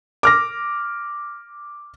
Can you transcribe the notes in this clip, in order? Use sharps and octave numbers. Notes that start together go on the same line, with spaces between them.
D6 F6 A#6